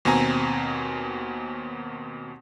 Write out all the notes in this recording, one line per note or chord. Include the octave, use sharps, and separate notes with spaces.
D#2 B2 C4 G#5 A#5